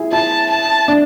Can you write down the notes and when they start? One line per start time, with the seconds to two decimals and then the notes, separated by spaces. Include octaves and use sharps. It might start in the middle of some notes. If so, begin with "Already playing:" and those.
Already playing: E4 G#4
0.13 E4 A5
0.50 A5
0.88 D4